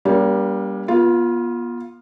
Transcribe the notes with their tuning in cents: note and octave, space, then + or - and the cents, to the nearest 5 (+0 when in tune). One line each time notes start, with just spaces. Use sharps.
G3 +5 A#3 +30 D4 -45
B3 -35 F4 +0